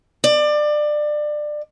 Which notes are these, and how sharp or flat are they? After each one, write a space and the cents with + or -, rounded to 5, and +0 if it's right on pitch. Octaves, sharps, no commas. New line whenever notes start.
D5 +25